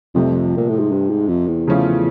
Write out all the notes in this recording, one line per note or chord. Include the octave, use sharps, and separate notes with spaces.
C2 F2 C3 F3 A3
A#2
A2
G#2
G2
G#2
F2
E2
C#3 F3 A3 C#4 F4